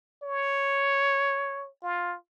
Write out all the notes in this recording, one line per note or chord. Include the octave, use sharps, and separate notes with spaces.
C#5
F4